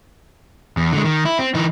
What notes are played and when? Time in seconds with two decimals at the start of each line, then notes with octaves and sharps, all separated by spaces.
0.77 E2
0.93 D3 G#3
1.04 D#3
1.25 E4
1.39 C4
1.55 E3 D#4